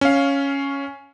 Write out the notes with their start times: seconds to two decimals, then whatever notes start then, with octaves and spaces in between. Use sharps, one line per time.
0.01 C#4 F5